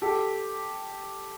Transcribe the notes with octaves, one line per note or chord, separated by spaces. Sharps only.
G4 A4